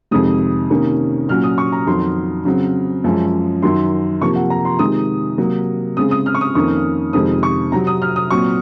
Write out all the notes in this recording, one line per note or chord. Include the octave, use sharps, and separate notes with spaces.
F2 C3 D#3 G#3 D#6
C3 D#3 A#3 C#4
A#2 F#3 C#4 F6
D#6
C#6
A#5
F2 D#3 F#3 C6
C#3 F#3 C4
F#2 F3 G#3 C#4
F#2 D#3 F#3 C6
C3 F3 A#3 C#6
F#5
A#5
C6
C3 D#3 G#3 D#6
C3 F#3 A#3
C#3 G#3 C4 D#6
D#6
F6
C#6
D#6
F2 D#3 A#3 C#4 C#6
F2 C3 D#3 G#3 C4 D#6
C#6
C3 F#3 C4 A#5
D#6
F6
D#6
A#2 F#3 C4 C#6